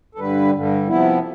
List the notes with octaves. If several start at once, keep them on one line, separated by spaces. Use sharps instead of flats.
A4
G2 D3 G3 B4
G2 D3 G3
C3 F3 B3 E4